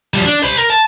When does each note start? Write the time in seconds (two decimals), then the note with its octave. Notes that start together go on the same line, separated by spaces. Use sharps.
0.14 F3 G3
0.26 D4
0.43 C5 B5
0.58 A#4
0.70 A5